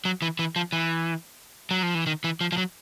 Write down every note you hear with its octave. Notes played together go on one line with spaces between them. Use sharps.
F#3
E3
E3
F3
E3
F#3
F3
E3
D#3
E3
F3
F3
F#3